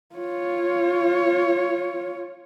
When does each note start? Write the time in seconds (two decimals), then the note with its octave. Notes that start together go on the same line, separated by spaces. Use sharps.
0.16 F4 C#5